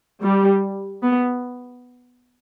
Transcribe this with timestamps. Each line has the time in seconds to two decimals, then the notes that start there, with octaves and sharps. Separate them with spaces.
0.21 G3
1.03 B3